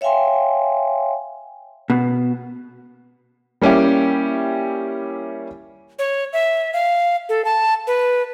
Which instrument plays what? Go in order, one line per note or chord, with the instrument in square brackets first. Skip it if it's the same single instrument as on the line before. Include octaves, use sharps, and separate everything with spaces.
[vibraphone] C#5 E5 F5 G5 G#5 C6
[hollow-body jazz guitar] B2
[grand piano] G3 A#3 C#4 E4 G4
[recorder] C#5
E5
F5
A4
A5
B4